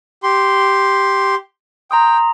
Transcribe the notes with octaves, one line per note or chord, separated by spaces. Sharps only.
G4 C6
G5 A#5 C6 D#6